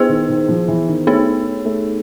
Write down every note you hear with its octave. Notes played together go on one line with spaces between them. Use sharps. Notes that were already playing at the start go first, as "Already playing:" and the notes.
Already playing: B3 E4 G#4 C5
D#3
D#3
F3
E3
D#3
A3 B3 D#4 G#4 C#5
A3